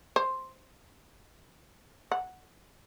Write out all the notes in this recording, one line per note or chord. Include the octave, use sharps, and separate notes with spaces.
C5
F#5